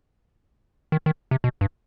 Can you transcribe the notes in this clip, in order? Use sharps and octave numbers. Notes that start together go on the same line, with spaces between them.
D#3
D#3
C3
B2
G2